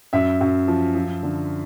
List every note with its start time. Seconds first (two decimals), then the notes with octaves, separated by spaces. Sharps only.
0.13 F#2 E5
0.41 F#2
0.68 F3
0.95 F3
1.23 D3